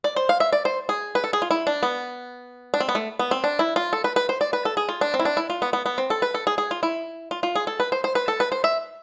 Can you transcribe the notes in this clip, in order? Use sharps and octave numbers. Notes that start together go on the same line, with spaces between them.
D5
C5
F5
E5
D5
C5
G#4
B4
A4
G#4
F4
E4
D4
B3
D4
C4
B3
A3
B3
C4
D4
E4
F4
A4
B4
B4
C5
D5
B4
A4
G#4
F4
D4
C4
E4
D4
E4
F4
B3
B3
B3
C4
A4
B4
A4
G#4
G#4
F4
E4
F4
F4
G#4
A4
B4
C5
C5
B4
A4
B4
C5
E5